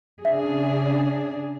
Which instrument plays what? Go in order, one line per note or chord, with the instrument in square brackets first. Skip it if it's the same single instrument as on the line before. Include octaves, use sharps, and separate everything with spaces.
[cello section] C#3 D4 G#4 [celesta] E5